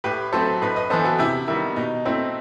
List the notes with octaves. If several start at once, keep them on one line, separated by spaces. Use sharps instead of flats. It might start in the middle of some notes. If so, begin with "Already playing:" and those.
A2 G4 B4
F#3 A3 C4 A4 C5
A2 B4 D#5
B4 D#5
E3 B3 A4 C5
F#4 A4
C3 E4 G4
D#3 G3 B3 E4
B2 D#4
A3 C4 E4